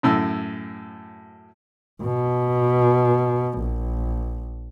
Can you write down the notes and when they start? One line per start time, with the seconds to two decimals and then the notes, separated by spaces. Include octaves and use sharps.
0.03 F#2 A2 E6
2.02 B2
3.59 A#1